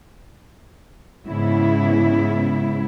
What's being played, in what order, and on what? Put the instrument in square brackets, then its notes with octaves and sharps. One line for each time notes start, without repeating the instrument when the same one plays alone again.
[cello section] G#2 C#3 B3 E4